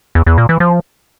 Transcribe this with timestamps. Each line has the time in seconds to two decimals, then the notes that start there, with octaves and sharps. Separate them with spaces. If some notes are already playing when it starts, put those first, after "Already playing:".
0.15 E2
0.26 E2
0.38 A#2
0.49 E3
0.60 F3